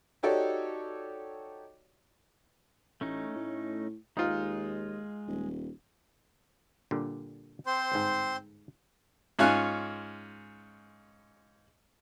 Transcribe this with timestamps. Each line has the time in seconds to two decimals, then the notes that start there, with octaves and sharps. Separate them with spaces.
0.23 D#4 F#4 G4 A4 C#5 D5
3.01 A1 A3 C#4 D#4
3.36 A2
4.17 D#2 G#3 D#4 F4
5.28 D#1
6.91 A#2 D3 G3
7.67 C4 C5 C6
7.92 G1 G#2
9.39 G#2 C#4 F4 G#5 F#6